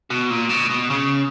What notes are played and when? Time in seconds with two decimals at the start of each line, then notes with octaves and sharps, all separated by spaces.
0.10 B2
0.30 A#2
0.50 B2
0.71 B2
0.90 C#3